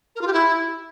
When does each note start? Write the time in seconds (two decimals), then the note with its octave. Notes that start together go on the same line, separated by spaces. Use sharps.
0.15 A#4
0.21 F4
0.27 G4
0.32 E4